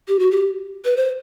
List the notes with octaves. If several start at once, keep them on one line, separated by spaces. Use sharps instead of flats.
G4
F#4
G4
B4
C5